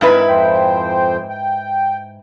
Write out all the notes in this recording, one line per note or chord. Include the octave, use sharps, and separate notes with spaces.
G#2 C4 E4 A#4 B4
F2 C5 G5
G5